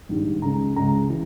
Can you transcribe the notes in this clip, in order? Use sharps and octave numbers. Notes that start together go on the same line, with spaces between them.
A#1 G#2 D#3 G3
C#2 C#3 G#3 A#5
C#2 C#3 G#3 A#5
E3